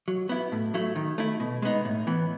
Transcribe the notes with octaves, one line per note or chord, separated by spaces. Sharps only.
F#3
B3 E4
A2
F#3 A3 E4
D#3
A3 E4
B2
G#3 B3 D#4
A2
E3 B3